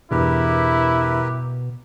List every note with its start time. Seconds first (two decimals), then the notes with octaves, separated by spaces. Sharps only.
0.11 E2 G2 B2 E4 G4 A#4 B4